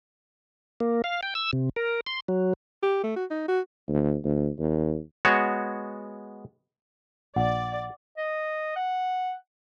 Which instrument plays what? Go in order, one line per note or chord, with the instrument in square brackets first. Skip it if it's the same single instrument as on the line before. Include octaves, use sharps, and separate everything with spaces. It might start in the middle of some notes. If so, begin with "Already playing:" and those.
[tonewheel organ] A#3
F5
G5
E6
C3
A#4
C6
F#3
[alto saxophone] G4
A3
F#4
D#4
F#4
[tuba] D2
D2
D#2
[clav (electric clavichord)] G#3 B3 F#4 C#5
[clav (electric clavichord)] A#1 [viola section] D5 [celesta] F#5
[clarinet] D#5
F#5